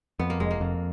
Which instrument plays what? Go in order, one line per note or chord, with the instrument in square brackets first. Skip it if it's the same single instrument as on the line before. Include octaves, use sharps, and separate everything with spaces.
[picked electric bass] F2 [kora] B3
[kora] A#3
[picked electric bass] F1 [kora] G#3
[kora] A#3
[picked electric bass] F2